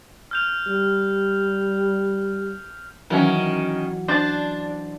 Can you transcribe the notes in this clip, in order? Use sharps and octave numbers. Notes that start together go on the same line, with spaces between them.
F6 G6 F7
G3
D#3 E3 F#3 C#4 A#4
D4 C5 D5 A5